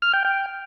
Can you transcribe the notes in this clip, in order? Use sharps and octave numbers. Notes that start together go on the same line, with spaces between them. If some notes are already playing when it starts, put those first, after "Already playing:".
F6
G5
G5